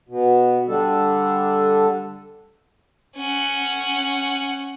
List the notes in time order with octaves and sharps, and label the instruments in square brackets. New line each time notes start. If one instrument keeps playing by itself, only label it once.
[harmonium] B2
D3 G3 D4 A4
[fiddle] C#4 F#5